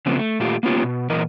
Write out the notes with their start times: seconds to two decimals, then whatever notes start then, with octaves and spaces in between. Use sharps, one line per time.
0.06 C#3 F3 A3 B3 C4
0.19 A3
0.40 A#2 A3 F4 G4
0.63 A#3 B3 C#4 F4 G4
0.84 B2
1.10 A#2 E3 A#4 D#5